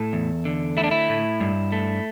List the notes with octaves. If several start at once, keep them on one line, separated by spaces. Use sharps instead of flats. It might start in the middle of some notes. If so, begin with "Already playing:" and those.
Already playing: A2 A4
E2
D3
A3 E4
D4
E4
A2
G2
A3